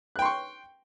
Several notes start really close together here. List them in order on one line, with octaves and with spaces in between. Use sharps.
F#6 G5 C6 C#6